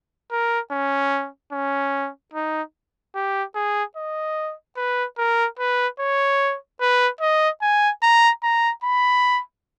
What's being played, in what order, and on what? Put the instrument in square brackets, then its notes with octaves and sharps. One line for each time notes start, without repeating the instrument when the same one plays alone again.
[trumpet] A#4
C#4
C#4
D#4
G4
G#4
D#5
B4
A#4
B4
C#5
B4
D#5
G#5
A#5
A#5
B5